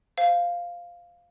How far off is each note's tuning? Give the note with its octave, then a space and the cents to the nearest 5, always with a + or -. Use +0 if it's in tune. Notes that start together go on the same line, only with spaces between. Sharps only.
C5 +0 F5 +0